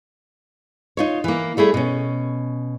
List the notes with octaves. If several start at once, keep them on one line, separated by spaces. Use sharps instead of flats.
D#4 F4 C#5
E3 A#3
G3 A3 E4 G#4
B2 C#4